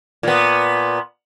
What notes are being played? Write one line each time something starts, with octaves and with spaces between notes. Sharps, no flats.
A#2 B3